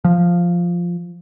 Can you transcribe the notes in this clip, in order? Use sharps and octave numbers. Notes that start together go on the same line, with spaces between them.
F3